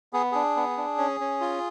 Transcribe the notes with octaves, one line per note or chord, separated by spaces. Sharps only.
B3 G#4
D4 G#4
B3
D4
C#4
C#4
F4